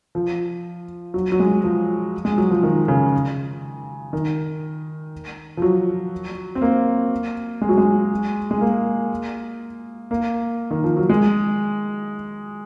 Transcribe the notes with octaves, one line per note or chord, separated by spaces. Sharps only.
F3
F#3
F#3
G#3
F3
G#3
F#3
F3
D#3
C#3
D#3
F3
F#3
C4
A#3
G#3
F#3
G#3
G#3
A#3
A#3
D#3
F3
F#3
G#3